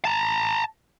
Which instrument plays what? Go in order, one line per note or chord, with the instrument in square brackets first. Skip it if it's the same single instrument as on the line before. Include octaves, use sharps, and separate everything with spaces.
[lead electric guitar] A5 A#5